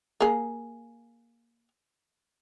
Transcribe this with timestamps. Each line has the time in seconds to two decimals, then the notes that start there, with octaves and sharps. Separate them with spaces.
0.21 A#3 G#4